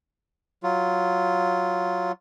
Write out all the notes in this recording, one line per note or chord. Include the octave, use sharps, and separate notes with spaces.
F#3 F4